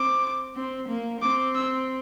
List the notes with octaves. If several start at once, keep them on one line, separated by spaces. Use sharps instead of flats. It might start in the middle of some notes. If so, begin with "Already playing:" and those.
Already playing: C4 D6
C4
A#3
C4 D6
E6